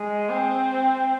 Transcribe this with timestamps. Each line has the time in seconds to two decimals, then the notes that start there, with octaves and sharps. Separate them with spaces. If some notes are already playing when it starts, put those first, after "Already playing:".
Already playing: G#3
0.30 C4